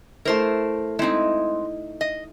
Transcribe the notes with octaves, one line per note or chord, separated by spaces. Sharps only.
A3 E4 A#4 C5
G#3 C4 D#4 E4
D#5